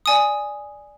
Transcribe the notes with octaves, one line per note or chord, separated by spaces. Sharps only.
D5 G#5 D#6